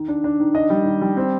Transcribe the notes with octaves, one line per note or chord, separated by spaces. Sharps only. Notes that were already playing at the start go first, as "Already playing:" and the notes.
Already playing: D#3
D4
D4
D#3
D4 D#5
G3
D#3
G3
C4